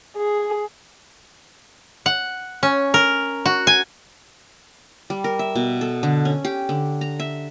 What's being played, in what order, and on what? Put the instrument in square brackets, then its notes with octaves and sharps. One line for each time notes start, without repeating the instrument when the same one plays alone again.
[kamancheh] G#4
[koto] F#5
C#4
A#4
F#4
G#5
[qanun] G3
A#4
E5
B2
A4
D3
C#4
G4
D3
A#5
E5